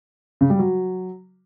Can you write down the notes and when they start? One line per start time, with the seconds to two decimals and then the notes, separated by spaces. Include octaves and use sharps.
0.41 C#3
0.50 G3
0.59 F#3